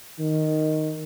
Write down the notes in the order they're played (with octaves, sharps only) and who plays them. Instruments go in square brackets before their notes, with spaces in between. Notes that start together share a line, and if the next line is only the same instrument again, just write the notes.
[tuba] D#3